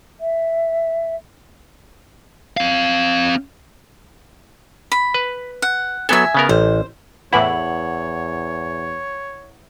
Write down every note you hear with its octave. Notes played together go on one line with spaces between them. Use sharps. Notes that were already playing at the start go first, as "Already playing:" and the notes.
E5
C4 F5
B5
B4
F#5
F#3 B3 A4 E5 G#5
C#3 B3 A#4
A1 C5
E2 A2 E3 E4 C#5 F#5 F#7